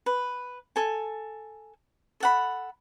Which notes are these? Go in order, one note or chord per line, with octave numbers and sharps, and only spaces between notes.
B4
A4 G#5
A4 F#5 B5